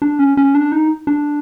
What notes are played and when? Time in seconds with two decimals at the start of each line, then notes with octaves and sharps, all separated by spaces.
0.02 D4
0.19 C#4
0.37 C#4
0.55 D4
0.72 D#4
1.07 D4